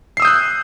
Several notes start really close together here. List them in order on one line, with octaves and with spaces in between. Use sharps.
C7 E6 D#6 G6 F#6